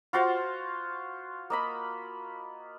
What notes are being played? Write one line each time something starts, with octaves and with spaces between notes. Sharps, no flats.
F4 F#4 C5 F5
A#3 D#5 B5